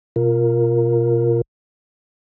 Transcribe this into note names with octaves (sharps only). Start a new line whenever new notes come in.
B2 F4 A#4